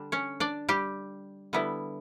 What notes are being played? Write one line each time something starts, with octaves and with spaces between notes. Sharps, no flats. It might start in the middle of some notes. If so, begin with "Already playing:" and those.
Already playing: D3 G3 D4
C#4 C#5
D4 D5
G3 G4
D3 G3 B3 E4